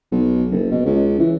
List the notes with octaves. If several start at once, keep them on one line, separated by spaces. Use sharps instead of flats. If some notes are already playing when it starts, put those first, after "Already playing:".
B1
F#1
B2
C#2
E3